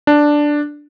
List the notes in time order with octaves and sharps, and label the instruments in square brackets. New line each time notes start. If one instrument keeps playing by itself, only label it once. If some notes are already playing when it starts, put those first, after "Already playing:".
[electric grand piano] D4